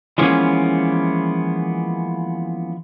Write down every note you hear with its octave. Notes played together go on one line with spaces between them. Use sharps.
E3 F3 G#3 A#3 B3 C#4